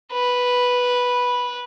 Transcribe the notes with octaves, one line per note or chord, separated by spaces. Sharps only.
B4